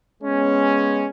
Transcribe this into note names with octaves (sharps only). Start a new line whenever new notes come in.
G#3 B3 C#4